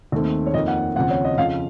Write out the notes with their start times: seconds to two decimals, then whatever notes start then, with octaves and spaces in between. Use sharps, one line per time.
0.12 D#2 D#3 A3 C4
0.46 C#5
0.54 F2 D#3 A#3 D#5
0.67 F#5
0.96 D#2 C#3 F3 C4 F#5
1.10 C#5
1.24 D#5
1.38 F2 C#3 F3 F5